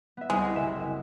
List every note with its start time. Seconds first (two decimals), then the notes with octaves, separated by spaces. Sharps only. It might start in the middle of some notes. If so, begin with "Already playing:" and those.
0.17 B3 E5
0.30 C2 G#3
0.41 A#4
0.55 F#1 E5 E7